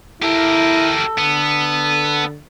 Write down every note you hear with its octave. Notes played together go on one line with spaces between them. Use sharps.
E4 G4 A4 A#4
D3 B3